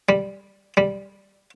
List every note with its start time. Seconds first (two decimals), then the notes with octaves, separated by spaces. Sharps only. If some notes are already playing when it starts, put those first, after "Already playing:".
0.09 G3
0.77 G3